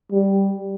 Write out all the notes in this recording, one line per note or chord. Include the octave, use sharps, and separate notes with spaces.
G3